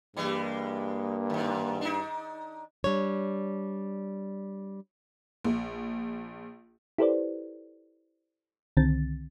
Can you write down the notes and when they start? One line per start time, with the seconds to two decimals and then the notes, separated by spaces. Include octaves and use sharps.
0.17 G2 E3 G3 G#3 A#3
1.30 G#2 D#3
1.81 D4 D#4
2.84 G3 D4 C#5
5.44 A#1
6.98 E4 G4 A4 B4 C5 D5
8.77 C2 D3 D#3 C4 A6